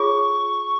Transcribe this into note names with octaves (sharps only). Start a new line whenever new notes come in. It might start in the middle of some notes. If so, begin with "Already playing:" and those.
Already playing: F4 G#4 C#5 C#6